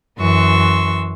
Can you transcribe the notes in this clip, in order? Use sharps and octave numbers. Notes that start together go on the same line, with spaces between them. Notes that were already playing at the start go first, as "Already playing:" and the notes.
F#2 E3 C6 C#6 E6